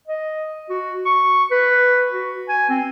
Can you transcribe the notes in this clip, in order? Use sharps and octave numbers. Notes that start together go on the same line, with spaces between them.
D#5
F#4
C#6
B4
F#4
G#5
C4